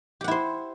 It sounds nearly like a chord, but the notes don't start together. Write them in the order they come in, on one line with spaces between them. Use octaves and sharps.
G4 F#5 E4 C5